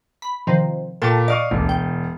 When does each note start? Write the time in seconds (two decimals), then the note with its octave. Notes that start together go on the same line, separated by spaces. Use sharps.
0.22 B5
0.47 C3 D#3 F3
1.02 A#2 A4 G5 A5
1.28 D5 D#5 F5 C#6
1.51 E1 A1 D2
1.69 G5